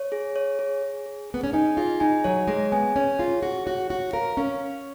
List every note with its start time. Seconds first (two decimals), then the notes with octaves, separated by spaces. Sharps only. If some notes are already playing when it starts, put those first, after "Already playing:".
Already playing: C#5
0.12 G#4
0.36 C#5
0.59 G#4
0.82 G#4
1.06 G#4
1.30 B3 G#4
1.44 C#4
1.53 D#4 G#5
1.77 F4 G#4
2.00 D#4 G#5
2.24 F#3 C#5
2.47 G#3 G#4
2.72 B3 G#5
2.96 C#4 C#5
3.19 F4 G#4
3.43 F#4 G#4
3.66 F#4 C#5
3.89 F#4 C#5
4.13 A#4 F5
4.37 C#4 F5